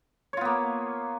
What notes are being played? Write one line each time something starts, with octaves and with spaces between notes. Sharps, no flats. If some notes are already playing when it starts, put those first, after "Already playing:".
A#3 B3 F4 C#5